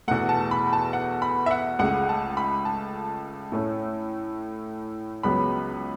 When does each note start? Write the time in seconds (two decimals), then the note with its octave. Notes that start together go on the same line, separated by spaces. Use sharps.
0.08 E2 B2 A3 F#5
0.29 A5
0.51 B5
0.73 A5
0.93 F#5
1.22 B5
1.46 E5
1.51 F#5
1.79 C#2 C#3 A3 F#5
2.09 A5
2.37 B5
2.65 A5
3.52 A2 A3 C#4
5.23 C#2 C#3 F#3 B3 B5